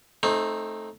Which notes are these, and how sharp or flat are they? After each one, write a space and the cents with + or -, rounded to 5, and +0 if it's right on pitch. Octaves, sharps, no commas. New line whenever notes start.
A3 -5 C4 +25 D#4 +0